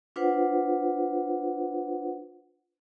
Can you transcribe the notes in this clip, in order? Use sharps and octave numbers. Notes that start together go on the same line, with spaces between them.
D4 F4 B4 C5 F#5